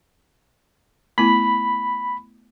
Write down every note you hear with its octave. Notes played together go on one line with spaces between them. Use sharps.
A3 B3 E4 B5